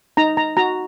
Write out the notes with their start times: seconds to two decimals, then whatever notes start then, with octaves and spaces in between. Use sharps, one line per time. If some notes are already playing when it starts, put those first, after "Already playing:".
0.17 D#4 A#5
0.37 A#5
0.57 F#4 A#5